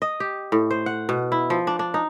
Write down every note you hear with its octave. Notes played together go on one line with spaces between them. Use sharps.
D#5
G4
A2
C5
F#5
B2
E4
F3
D4
D4
D#4